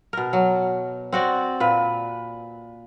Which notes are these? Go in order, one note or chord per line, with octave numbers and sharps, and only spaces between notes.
B2 A#4
F#3
C4 F#4 D5
A#2 B4